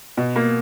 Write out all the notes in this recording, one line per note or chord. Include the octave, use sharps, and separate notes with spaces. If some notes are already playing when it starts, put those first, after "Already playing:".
B2
A#3